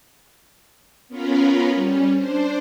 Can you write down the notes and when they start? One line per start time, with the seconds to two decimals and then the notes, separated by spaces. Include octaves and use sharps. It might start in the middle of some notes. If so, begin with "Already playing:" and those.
1.08 B3 C#4 F4 A#4 B4
1.74 G3 C#4
2.13 D4 C5